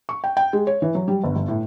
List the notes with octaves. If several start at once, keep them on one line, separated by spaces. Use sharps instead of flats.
C#6
G5
G5
G#3
C#5
E3
F#3
G3
G1
G1
A2